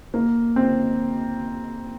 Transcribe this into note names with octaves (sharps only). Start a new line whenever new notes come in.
A#3
C4